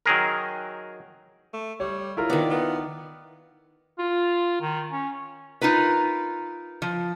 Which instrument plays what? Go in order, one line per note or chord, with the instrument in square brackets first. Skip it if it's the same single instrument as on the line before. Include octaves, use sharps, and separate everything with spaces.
[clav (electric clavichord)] D#3 F#3 G#4 A#4
[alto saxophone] A3
[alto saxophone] G3 [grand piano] C#5
[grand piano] E4 F4 A#4
[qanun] D#3 D5 [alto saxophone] B3
[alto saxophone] B3
[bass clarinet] F4
D#3
C#4
[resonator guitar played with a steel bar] D#4 F4 A#4 B4
F3